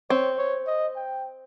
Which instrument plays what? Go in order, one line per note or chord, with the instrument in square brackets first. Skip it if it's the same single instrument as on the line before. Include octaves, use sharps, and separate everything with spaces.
[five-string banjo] C4 [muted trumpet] C#5
[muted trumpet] C#5
D#5
G5